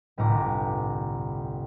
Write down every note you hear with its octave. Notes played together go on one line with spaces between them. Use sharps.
G1 C2 A2 A#5 D6